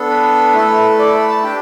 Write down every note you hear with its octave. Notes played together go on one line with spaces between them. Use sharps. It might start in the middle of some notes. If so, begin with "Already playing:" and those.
Already playing: B3 D4 A4
B4
A3 E4 A4
D5
B4
A5
D4 G4 G5